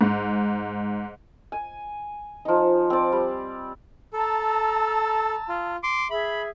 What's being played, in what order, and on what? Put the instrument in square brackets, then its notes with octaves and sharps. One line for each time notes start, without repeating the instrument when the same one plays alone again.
[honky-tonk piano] G#2
[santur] G#5
F3 D#4
C4 D5
G3
[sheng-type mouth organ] A4 [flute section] A5 A#5 E6
[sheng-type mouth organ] F4
C6 D6
[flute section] G#4 E5 [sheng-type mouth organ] B5